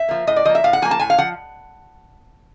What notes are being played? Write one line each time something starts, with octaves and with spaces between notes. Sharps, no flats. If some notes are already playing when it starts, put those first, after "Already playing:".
Already playing: E5
F3 A#3
A2 D#5
D5
F3 A#3 D#5
E5
A2 F5
F#5
F3 A#3 G#5
A5
A2 G#5
F5
F3 F#5